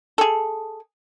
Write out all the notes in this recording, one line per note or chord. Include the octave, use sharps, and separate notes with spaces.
G#4 A4